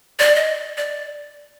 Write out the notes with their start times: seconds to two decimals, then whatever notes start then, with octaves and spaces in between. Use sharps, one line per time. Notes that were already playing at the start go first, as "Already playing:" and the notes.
0.19 D5
0.36 D#5
0.78 D5